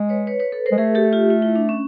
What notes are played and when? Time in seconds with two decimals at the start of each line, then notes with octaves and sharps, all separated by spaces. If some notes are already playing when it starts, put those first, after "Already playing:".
Already playing: G#3
0.09 B4 C#5
0.27 B4 C#5
0.39 B4 C#5
0.52 A4 B4
0.66 A#4 C5
0.72 G#3
0.78 A3 G#4 A#4
0.95 G4 A4
1.13 F4 G4
1.30 F4
1.42 E4
1.56 D4
1.69 C#4